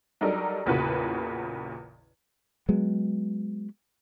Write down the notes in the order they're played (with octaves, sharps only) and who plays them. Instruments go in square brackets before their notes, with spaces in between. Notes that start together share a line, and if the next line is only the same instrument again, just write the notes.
[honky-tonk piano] F#3 G3 D4 D#4 A4 A#4
A1 E2 A#2 C#3 F#4 B4
[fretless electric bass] F#3 G#3 B3